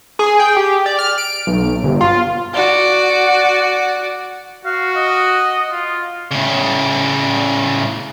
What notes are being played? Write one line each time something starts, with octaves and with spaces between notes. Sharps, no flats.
G#4
G5
G4
D5
F6
D7
B1
G1
F4
F#4 D5
F#4 F5
D#5
F4
A2 C#3